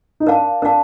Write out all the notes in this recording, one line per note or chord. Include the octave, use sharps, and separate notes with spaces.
D#4
D4 A#4 F5 A5
D4 A#4 F5 A5